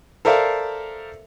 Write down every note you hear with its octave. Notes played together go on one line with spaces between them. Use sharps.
A4 A#4 C5 D5 E5 F5